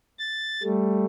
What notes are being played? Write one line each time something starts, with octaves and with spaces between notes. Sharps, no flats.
A6
G3 A3